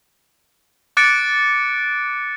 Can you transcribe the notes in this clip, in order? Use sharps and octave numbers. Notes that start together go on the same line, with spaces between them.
D6 F#6 A6 C#7 D7